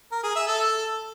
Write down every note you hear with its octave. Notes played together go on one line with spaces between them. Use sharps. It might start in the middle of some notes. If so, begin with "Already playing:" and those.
A#4
G#4
E5
A4